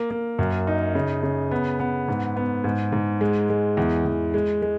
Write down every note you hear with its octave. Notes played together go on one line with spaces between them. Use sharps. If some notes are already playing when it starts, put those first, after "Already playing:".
Already playing: A#3
A#3
F#2
D#4
C#3
C#3
B3
B3
G#2
B3
G#2
G#2
G#3
G#3
E2
E2
G#3
G#3